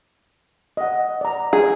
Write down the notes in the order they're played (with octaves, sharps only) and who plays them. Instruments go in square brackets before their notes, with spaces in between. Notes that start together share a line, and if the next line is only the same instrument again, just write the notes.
[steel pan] D#5 F#5
D5 A#5
[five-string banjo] G#4